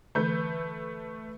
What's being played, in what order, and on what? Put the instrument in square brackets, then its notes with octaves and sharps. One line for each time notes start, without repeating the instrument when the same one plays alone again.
[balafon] D3 E3 [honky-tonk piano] A3 B4 G6